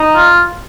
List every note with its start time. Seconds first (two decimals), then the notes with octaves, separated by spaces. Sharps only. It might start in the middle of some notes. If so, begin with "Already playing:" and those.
Already playing: D#4
0.16 F4